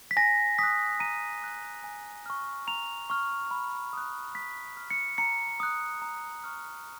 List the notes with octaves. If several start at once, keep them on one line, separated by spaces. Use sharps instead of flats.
B6
G#5 A#6
D#6 F#6 B6
A#5 D#7
D#6 F#6
G#5
C#6 F6
A#5 F7
C#6 F6
B5
D#6 F#6
B5 B6
F6
C#7
A#5 C#7
D#6 F#6
A#5
C#6 F6